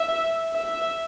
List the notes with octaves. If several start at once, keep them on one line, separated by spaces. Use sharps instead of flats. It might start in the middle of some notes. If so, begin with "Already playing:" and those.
Already playing: E5
E5